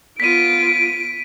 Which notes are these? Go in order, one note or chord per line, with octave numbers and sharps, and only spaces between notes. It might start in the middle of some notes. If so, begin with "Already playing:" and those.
B3 F4 B6 D7 D#7